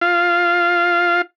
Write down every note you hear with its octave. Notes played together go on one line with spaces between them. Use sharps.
F4 F5